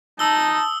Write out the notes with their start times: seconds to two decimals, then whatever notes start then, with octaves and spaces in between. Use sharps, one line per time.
0.19 D#4 A5 D#6 E6 G7